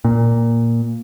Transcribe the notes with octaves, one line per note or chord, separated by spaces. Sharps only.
A#2